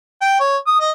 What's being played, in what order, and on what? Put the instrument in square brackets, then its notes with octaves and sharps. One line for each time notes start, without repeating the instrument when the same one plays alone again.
[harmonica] G5
C#5
D#6
D#5